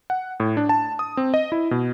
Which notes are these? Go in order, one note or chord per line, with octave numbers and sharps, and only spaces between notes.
F#5
A2
D4
A5
D#6
C4
D#5
E4
B2